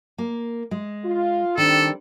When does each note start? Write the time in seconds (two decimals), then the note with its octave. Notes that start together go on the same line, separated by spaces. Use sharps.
0.18 A#3
0.71 G#3
1.04 F4
1.58 D#3 G3 C4 D4 A4